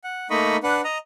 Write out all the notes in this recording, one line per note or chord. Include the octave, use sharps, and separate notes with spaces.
F#5
A3 A#3 D#4 D#5 B5 C#6
D4 B4 F#5
D#5 A#5